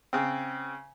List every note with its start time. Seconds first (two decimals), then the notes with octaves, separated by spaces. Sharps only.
0.13 C#3 C4